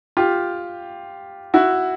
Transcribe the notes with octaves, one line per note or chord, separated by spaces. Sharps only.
F4 G4
E4 F#4